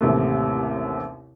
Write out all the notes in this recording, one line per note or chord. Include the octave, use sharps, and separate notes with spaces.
A1 D#2 C3 A3